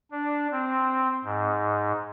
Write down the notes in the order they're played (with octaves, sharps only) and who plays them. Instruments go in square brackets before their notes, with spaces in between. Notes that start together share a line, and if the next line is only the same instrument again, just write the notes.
[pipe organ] D4
C4
G#2